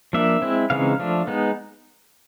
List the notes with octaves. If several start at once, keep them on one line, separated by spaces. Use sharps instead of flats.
F3 A#3 D4 E5
G#3 C4 E4
C#3 E3 G#3 C4 D#4 F5
F3 A3 D4
G#3 B3 D#4